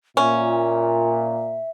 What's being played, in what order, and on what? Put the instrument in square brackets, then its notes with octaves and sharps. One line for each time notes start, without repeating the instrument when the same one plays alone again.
[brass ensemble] A#2 [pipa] C#4 [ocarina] E5